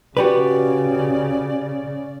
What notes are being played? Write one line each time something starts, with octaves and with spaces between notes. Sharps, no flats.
C#3 F#4 G4 B4 D5